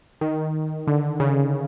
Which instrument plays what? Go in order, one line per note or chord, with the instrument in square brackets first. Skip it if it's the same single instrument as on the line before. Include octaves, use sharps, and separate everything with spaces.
[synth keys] D#3
D3
C#3